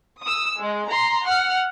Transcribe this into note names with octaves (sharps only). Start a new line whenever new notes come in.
D#6 E6
G#3
A#5 C6
F#5 F6